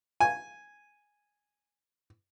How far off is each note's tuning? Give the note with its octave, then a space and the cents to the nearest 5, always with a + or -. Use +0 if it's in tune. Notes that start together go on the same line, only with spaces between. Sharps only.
G#5 -5